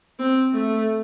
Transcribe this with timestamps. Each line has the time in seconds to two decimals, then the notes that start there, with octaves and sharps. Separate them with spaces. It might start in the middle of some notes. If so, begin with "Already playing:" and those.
0.19 C4
0.54 A3